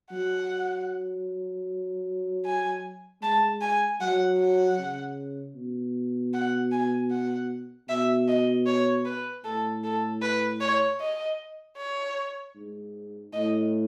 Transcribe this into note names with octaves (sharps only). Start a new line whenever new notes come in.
F#3 F#5
G#5
G#3 A5
G#5
F#3 F#5
F#5
C#3
B2
F#5
G#5
F#5
B2 E5
D#5
C#5
B4
A2 A4
A4
B4
C#5
D#5
C#5
G#2
A2 D#5